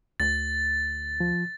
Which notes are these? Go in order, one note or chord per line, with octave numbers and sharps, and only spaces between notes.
D2 A6
F3